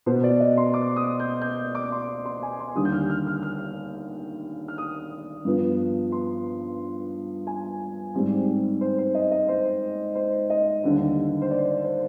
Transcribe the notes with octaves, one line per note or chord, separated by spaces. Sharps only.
B2 B3 C5
D5
D#5
C6
D6
D#6
G6
G6
D6
C6
C6
G#5
C6
D#2 D3 G3 D#6
G6
F6
F6
F6
F6
F6
D#6
G2 F3 B3
C6
G#5
G#2 G3 C4
C5
C5
D#5
D#5
C5
C5
D#5
D#2 D3 G3
C5
D5
C5